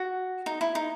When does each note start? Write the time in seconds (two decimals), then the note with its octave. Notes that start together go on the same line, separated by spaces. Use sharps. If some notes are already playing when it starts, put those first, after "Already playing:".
Already playing: F#4
0.46 D#4
0.61 E4
0.75 D#4